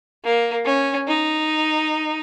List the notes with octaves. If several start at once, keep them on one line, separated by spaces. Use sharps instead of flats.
A#3
C#4
D#4